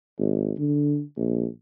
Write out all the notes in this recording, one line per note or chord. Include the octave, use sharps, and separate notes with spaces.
G#1
D3
A#1